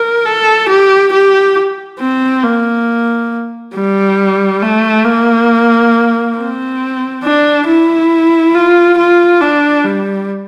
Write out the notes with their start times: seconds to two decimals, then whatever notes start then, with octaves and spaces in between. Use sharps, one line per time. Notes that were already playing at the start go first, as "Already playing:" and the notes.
Already playing: A#4
0.26 A4
0.69 G4
1.13 G4
2.00 C4
2.44 A#3
3.74 G3
4.62 A3
5.05 A#3
6.37 C4
7.23 D4
7.67 E4
8.55 F4
8.98 F4
9.41 D4
9.85 G3